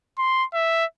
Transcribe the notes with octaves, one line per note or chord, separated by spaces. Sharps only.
C6
E5